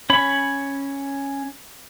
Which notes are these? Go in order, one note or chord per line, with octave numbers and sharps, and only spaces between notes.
C#4 C#5 B5